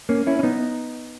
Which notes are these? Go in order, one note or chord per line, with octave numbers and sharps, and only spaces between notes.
A#3 C#4
C#4 E4
C#4
B3 D#4